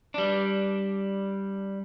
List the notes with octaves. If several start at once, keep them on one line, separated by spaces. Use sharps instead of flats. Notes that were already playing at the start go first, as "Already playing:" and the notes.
G3 D4